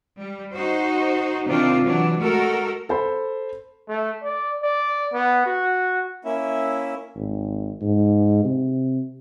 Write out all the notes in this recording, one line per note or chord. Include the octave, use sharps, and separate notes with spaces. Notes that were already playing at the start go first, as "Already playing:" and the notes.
G3
D#4 F#4 C5
C3 D#3 C4 D4 F4
E3 F#3 D4
G#3 A3 F#4 A4 A#4
A4 C5 B5
A3
D5
D5
B3
F#4
A#3 C#4 E4 E5
G#1
G#2
C3